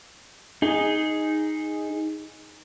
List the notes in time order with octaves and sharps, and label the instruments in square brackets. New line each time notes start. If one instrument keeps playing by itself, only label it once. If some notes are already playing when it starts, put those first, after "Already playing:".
[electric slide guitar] D#4 G#4